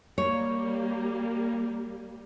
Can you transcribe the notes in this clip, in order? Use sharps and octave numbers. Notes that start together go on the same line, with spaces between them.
G3 A#3 C#5